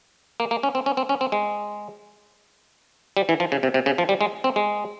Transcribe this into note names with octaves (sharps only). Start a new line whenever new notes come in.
A#3
A#3
C#4
C4
C#4
C4
C#4
C4
G#3
G3
E3
F3
C#3
C3
C3
C#3
F3
G3
G#3
C4
G#3